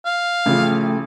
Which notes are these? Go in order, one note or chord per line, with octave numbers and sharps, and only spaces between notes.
F5
A1 C#3 F3 A3